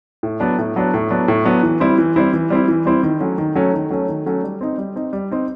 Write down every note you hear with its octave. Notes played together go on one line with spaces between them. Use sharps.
A2
F#3 B3 D4
A2
F#3 B3 D4
A2
F#3 B3 D4
A2
F#3 B3 D4
E3
G3 C4 E4
E3
G3 C4 E4
E3
G3 C4 E4
E3
G3 C4 E4
D#3
F#3 A3 C#4
D#3
F#3 A3 C#4
D#3
F#3 A3 C#4
D#3
F#3 A3 C#4
G3
C4 D#4
G3
C4 D#4
G3
C4 D#4